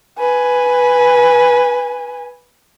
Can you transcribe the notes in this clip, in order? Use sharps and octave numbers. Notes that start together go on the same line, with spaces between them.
B4 G#5